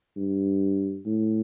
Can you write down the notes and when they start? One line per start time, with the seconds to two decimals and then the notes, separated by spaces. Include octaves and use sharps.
0.17 G2
1.05 A2